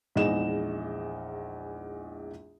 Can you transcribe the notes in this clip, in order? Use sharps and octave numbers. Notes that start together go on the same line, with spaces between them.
A#1 E2 G#3 D#4 D#5 E7